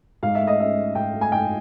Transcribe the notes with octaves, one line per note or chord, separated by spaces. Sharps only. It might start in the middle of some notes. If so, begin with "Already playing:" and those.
G#2 F5
E5
A3
D#5
C#4 E5
A3
G#2 G5
A3
G#5
G#2 G5